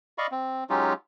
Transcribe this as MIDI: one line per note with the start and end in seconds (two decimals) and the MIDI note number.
0.18 0.27 74
0.18 0.27 75
0.18 0.27 77
0.18 0.27 83
0.18 0.27 85
0.32 0.64 60
0.70 0.93 54
0.70 0.93 56
0.70 0.93 61
0.70 0.93 63
0.70 0.93 65
0.70 0.93 67